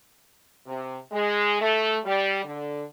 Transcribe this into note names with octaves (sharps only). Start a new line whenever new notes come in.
C3
G#3
A3
G3
D3